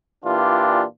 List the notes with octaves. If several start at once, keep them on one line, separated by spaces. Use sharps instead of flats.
A#2 E3 D4 F4 G4